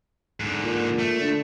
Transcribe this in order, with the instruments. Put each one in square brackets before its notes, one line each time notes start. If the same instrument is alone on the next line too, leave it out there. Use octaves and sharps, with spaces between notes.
[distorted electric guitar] G#2 D3
[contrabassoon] A#2
[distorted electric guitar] A3
[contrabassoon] D3